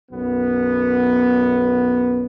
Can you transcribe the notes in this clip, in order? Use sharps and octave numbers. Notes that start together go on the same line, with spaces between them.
B1 F#2 B3